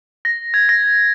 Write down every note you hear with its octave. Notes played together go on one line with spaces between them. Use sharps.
A#6
G#6
A#6